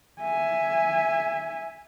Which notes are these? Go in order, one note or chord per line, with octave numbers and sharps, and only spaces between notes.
E5 G#5